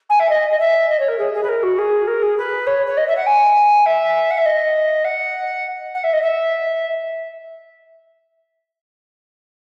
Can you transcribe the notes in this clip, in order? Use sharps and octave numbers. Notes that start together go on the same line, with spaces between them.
G#5
E5
D#5
D#5
E5
D#5
C#5
A#4
G#4
G#4
B4
A#4
F#4
G#4
A#4
G#4
B4
C#5
C#5
D#5
E5
F#5
G#5
E5
F#5
E5
D#5
F#5
F#5
E5
D#5
E5